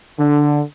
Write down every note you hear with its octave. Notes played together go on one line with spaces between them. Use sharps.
D3